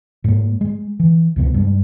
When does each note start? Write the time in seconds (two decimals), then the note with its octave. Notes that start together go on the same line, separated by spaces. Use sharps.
0.24 G#2 G#3 A#3
0.61 G#3
1.00 E3
1.36 C#2 C3 B3
1.54 G2 G#3